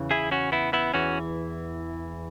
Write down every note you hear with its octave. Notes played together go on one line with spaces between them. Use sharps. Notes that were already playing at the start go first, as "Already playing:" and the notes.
Already playing: E2 C#3 E3
E4 G#4
C#4 F#4
B3 E4
B3 E4
E2 E3 C#4 F#4